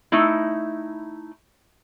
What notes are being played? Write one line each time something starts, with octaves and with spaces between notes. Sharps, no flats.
A3 D#4 E4